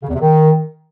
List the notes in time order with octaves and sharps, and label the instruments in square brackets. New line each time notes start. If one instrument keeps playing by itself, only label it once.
[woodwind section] C#3
E2
C3
D#3